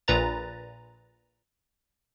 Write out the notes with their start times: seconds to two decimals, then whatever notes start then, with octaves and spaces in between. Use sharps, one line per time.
0.08 A#1 A#2 B4 A#5 A6